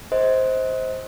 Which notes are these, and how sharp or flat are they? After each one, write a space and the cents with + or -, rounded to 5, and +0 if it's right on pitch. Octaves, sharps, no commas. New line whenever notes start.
C5 +0 D#5 +35